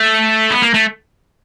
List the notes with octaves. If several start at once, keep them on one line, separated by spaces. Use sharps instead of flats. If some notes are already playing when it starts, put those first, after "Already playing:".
Already playing: A3
B3
A#3
A3